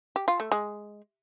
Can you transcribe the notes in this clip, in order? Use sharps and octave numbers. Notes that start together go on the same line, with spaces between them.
G4
F4
A3
G#3